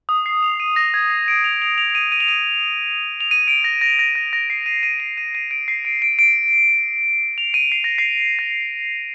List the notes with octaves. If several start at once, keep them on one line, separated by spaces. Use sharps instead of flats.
D#6
C7
F7
D#7
A#6
G#6
C7
D7
F7
F7
F7
F7
D#7
D#7
F7
D#7
F7
D#7
D7
A#6
A#6
A#6
A#6
A#6
C7
D#7
D#7
D#7
D#7
D#7
D7
C7
D7
D7
D7
F7
D#7
C7
A#6
C7
A#6